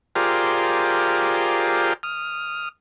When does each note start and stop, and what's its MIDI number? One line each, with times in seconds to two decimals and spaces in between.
0.15 1.93 65
0.15 1.93 67
0.15 1.93 68
0.15 1.93 70
0.15 1.93 72
0.15 1.93 74
2.03 2.69 87
2.03 2.69 89